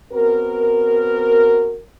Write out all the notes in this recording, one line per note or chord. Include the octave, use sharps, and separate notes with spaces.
B3 C4 F#4 A#4